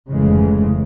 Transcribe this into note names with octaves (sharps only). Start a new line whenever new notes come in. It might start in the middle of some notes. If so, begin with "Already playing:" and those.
F1 G#2 C#3 E3 G#3